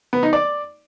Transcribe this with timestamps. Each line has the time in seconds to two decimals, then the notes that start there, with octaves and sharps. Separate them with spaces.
0.13 B3
0.23 D#4
0.33 D5